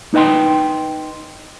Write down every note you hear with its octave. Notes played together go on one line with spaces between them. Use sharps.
D#4 B4 D#5 G5 C6